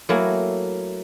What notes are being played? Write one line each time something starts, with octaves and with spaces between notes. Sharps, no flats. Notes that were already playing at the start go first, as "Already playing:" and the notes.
F#3 A3 A#3 E4 A#4 G#5